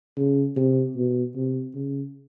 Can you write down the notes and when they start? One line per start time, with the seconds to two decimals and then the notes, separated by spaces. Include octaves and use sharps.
0.17 C#3
0.56 C3
0.96 B2
1.35 C3
1.74 C#3